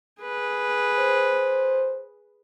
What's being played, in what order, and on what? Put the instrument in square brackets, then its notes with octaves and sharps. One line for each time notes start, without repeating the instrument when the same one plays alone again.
[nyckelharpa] G#4 B4
[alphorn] C5